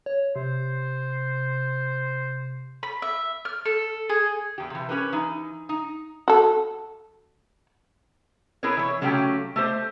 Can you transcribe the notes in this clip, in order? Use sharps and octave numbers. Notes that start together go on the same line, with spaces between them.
C#5
C3 C5
B5
E5
F6
A4
G#4
E2 G4
C3 E3
C#4 G4 A#4 B4
E3 D#4
D#4
F#4 A4
E4 G#4 A#4 B4 C#5
E3 C#5
C#3 F#3 A3 C#4 G4 G5
A3 G4 C5